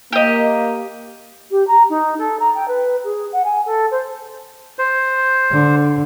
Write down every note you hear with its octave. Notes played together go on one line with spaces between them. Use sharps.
A#3 G4 D#5
G4
A#5
D#4
A4
A#5
G5
B4
G#4
F#5
G#5
A4
C5
C5
D3